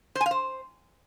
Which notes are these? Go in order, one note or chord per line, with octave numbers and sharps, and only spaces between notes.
C5
G#5
F5
C5